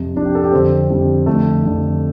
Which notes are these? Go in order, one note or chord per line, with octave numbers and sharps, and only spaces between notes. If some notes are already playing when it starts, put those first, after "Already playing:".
Already playing: F2 C3
F2 C3 D4
G4
A4
G4
F2 D3 C4
F2 D3 G3
F2 D3 A3
F2 D3